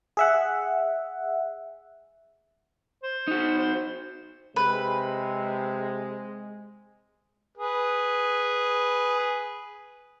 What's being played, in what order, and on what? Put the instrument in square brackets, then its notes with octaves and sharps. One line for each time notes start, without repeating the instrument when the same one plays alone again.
[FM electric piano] G#4 E5 F#5
[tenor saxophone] C5
[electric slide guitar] D#4 F#4
[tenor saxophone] C5
[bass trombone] C3 [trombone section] G#3 [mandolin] B4
[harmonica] G#4 B4